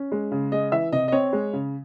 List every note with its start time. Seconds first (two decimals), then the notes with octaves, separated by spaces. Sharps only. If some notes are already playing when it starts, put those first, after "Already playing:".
Already playing: C#4
0.12 G#3
0.31 C#3
0.52 G#3 D#5
0.72 E3 E5
0.92 C3 D#5
1.08 D#5
1.12 C4 C#5
1.33 G#3
1.53 C#3